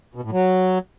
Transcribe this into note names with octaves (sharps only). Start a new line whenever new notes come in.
B2
A2
F#3